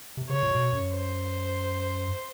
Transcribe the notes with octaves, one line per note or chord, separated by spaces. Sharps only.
C3
C#3 C#5
A#2
B2
F#2
C5